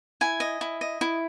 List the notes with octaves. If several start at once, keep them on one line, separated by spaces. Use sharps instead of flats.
E4 G#5
D#5
E4
D#5
E4